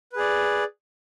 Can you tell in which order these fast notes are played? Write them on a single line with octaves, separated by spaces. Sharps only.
B4 G#4 D5